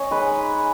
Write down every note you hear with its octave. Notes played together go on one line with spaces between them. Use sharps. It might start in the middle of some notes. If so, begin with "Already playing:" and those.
Already playing: C#4 C#5 D#5
G#3 D#4 B4